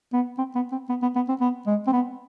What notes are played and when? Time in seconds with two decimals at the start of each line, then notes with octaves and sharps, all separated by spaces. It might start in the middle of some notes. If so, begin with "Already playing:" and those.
0.13 B3
0.38 C4
0.55 B3
0.72 C4
0.89 B3
1.02 B3
1.15 B3
1.29 C4
1.40 B3
1.67 G#3
1.87 C4
1.92 B3